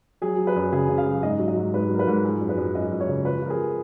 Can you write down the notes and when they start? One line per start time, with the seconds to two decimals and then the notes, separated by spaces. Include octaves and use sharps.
0.22 F#3 G#4
0.38 F#3
0.47 B4
0.56 F#2
0.73 C#3 G#4
0.89 C#3
0.98 F5
1.06 F#3
1.23 G#2 D#5
1.39 F#3
1.48 D#5
1.57 G#2
1.74 G#2 B4
1.90 F#3 A#4
1.99 B4
2.07 G#2
2.24 F3 G#4
2.41 F#2
2.49 B4
2.57 F#2
2.75 F#2 D#5
2.92 F#2
3.00 C#5
3.08 C#3
3.25 F3 B4
3.42 F3 A#4
3.50 G#4